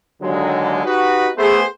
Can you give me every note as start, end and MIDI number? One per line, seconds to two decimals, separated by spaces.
0.22 0.82 39
0.22 0.82 50
0.22 0.82 54
0.22 0.82 56
0.85 1.29 63
0.85 1.29 66
0.85 1.29 67
0.85 1.29 71
1.37 1.63 57
1.37 1.63 59
1.37 1.63 68
1.37 1.63 72